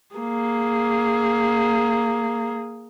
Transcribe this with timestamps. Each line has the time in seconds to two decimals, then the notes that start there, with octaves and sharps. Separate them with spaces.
0.16 A#3 G#4